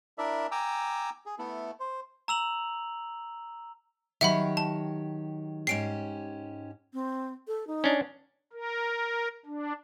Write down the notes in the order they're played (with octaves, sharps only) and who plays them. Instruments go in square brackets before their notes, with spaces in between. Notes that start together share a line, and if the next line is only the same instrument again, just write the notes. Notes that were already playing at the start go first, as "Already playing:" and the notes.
[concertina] D4 E4 A#4 D5 E5
G5 G#5 A#5 D6 E6
G#4
A3 B3 E4 A4
C5
[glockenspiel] A#5 E6 F7 F#7
[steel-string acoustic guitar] D#3 F#3 G4 [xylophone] E5 F#5 B5
[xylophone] A5
[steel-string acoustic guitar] G#2 C#4 G4 [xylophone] C7 D7
[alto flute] C4
A4
D#4
[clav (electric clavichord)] C#4 D4
[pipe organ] A#4
D4